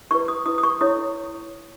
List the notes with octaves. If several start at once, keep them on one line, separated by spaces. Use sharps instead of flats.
E4 B4 C#6
D#6
E4 B4 D#6
D#6
C#6
E4 A4 C#5 D#6